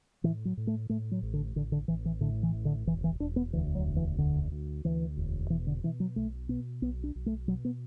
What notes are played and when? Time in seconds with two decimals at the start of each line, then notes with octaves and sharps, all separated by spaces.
0.23 A2 E3
0.45 F#3
0.57 A2
0.67 A3
0.89 A2 A3
1.11 F#3
1.22 A1
1.34 D3
1.56 A1 D3
1.72 D3
1.88 A1 E3
2.05 E3
2.21 A2 D3
2.43 E3
2.54 A1
2.65 D3
2.87 E1 E3
3.04 E3
3.20 E1 D4
3.36 B3
3.53 D2 E3
3.75 F#3
3.86 E1
3.96 E3
4.18 D2 D3
4.52 D2
4.85 D2 E3
5.17 E1
5.50 B2 E3
5.67 D3
5.83 B2 E3
6.00 F#3
6.16 B1 A3
6.49 B2 B3
6.82 B1 B3
7.04 D4
7.15 B1
7.26 A3
7.48 B2 F#3
7.65 B3